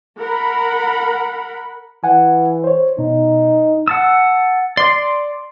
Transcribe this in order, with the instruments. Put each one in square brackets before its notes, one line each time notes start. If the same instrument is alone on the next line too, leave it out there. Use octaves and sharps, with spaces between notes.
[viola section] A#4 F#5 B5
[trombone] E3 [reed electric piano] F#5 G#5
[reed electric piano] C5 C#5
[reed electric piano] B2 [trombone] D#4
[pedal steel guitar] F#5 A5 E6
[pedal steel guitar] D5 D6 [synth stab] C6